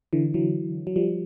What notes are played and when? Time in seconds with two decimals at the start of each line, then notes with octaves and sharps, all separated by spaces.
0.13 D3 E3
0.34 E3 F#3
0.87 F#3
0.96 F3 G3